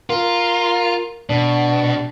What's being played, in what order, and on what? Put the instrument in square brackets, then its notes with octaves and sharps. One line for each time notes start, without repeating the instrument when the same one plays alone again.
[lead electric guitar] F4 [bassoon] A#4
[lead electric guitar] B2 [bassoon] D4